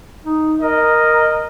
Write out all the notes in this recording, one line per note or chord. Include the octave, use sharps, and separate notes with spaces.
D#4
A#4 D#5